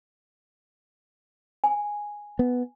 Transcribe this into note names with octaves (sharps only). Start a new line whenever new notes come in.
G#5
B3